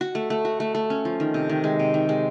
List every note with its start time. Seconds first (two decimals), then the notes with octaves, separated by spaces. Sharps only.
0.01 F#4
0.15 A3
0.30 A3
0.45 F#4
0.60 A3
0.75 A3
0.90 C#4
1.05 F3
1.20 D#3
1.34 C3
1.49 D#3
1.64 G#3
1.79 C3
1.94 D#3
2.09 G#3